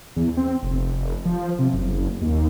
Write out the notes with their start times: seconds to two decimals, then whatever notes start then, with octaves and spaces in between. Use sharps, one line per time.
0.16 E2
0.37 C4
0.63 F1
1.25 F3
1.59 C3
1.73 F#1
2.22 D#2